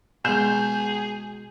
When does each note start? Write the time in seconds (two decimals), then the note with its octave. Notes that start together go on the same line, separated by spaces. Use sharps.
0.25 B2 G#3 G#4 G6 E7